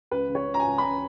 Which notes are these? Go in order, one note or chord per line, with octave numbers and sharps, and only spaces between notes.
C#2 B4
C#3
C#5
C#3
A#5
G#5
C#2
B5
C#2 A#5